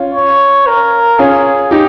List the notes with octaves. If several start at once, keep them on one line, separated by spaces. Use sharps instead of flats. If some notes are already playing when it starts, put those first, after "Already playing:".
Already playing: C#4 F4
C#5
A#4
C#4 F4 G#4
D#4 G4